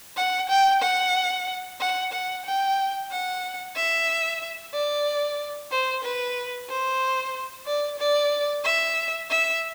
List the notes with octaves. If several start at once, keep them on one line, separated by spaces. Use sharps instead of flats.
F#5
G5
F#5
F#5
F#5
G5
F#5
E5
D5
C5
B4
C5
D5
D5
E5
E5